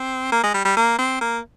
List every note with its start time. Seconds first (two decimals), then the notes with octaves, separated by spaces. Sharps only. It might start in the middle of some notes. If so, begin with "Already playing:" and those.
Already playing: C4
0.32 A#3
0.43 G#3
0.54 G3
0.65 G3
0.77 A#3
0.98 C4
1.21 A#3